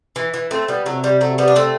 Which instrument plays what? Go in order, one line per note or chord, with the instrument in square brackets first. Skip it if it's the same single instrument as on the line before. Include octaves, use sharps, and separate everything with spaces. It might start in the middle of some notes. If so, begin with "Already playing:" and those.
[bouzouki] E3
E3
A3 C4
G3 B3
[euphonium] C3 [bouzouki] F#3 A3
[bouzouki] G3
F#3 A3
G3 B3
D4
A3 C4